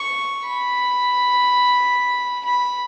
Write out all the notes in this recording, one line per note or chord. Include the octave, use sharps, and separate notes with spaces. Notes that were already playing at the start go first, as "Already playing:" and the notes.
Already playing: C#6
B5
B5